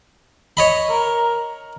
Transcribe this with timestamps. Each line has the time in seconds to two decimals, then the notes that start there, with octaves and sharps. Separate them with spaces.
0.57 C#5 D#5 B5
0.90 A#4